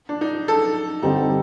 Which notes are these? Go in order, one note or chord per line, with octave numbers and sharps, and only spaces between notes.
D4
D#4
A4
D3 G3 C4 D#4